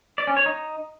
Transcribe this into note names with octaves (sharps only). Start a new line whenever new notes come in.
D5
C#4
C#5
D#4